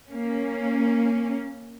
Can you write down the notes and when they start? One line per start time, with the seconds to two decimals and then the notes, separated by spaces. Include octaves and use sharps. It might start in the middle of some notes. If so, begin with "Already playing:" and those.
0.11 A#3 C#4